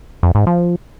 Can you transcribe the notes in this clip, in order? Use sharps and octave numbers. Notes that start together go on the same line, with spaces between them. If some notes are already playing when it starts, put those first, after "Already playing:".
F2
G#2
F3